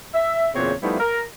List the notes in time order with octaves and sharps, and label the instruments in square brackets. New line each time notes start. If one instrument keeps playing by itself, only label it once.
[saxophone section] E5
E2 A#2 C#3 C4 C#5
F3 G3 A3 B3 D#4 E4
A#4